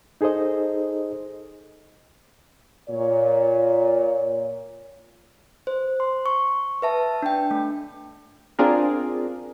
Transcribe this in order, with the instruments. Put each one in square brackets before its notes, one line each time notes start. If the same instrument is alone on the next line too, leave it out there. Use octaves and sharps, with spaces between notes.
[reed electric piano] D#4 G#4 A4 C5 D#5
[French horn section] A#2 C#5
[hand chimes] C5
C6
C#6
B4 E5 A5
D4 G5
A3
[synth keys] C4 D4 F4 G#4 A#4